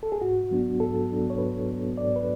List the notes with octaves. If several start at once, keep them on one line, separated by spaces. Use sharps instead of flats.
A4
G#4
G#2 F#4
F#3 B3 D4
G#2 A4
F#3 B3 D4
C#5
G#2 B4
F#3 B3 D4
G#2 D5
B4